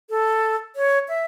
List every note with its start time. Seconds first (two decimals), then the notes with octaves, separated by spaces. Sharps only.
0.10 A4
0.76 C#5
1.09 E5